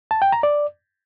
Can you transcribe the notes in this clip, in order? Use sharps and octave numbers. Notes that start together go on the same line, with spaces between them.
A5
G5
A#5
D5